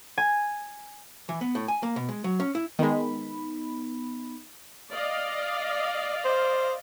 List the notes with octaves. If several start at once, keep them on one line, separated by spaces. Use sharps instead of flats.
G#5
E3
B3
A2
G#5
A#3
B2
G#3
F#3
C#4
E4
D#3 G#3 B3 D#4 B5
D5 D#5 F5
C5